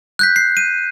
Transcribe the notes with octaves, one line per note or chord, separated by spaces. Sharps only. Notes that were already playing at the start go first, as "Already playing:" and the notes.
F#6 G6 B6
C7
D#7